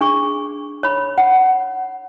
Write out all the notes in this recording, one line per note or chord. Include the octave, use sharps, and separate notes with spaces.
D4 G#4 C#6
C#5 B5
F#5